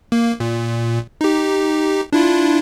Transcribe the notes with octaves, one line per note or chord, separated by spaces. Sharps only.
A#3
A#2
D#4 G4
D4 E4 F4